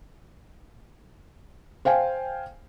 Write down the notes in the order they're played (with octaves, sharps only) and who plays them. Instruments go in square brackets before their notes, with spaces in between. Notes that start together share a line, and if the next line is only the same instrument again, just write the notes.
[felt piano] C5 F5 G5 G#5